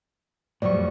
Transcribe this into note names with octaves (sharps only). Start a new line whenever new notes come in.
F2 A2 F#3 G3 D5 C#6